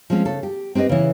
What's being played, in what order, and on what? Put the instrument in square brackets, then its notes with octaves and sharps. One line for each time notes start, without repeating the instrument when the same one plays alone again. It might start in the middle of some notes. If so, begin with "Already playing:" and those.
[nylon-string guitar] F3 G#3 C4 C#4
C#3 A4
G4
C4 G4 B4 D5 D#5
C#3 E3